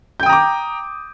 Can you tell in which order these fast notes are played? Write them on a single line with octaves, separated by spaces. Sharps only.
G6 G5 D#6 A#5 D6